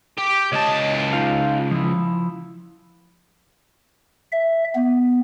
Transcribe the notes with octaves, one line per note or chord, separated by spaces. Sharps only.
G4
C#2 C#5 D#5 A5
D#4 F4 F5
F3 E4
E5
B3